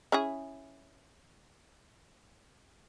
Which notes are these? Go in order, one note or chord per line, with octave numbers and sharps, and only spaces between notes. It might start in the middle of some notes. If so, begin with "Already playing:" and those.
C#4 E4 G#4